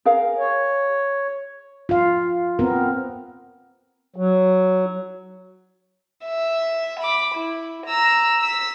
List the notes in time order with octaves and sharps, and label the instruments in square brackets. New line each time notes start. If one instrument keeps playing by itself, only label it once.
[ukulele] G#4 A#4 F5
[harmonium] C#5
[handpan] F4 F5
B3 C4 A#4
[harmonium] F#3
[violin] E5
B5 D6
E4
A#5 E6
E6 B6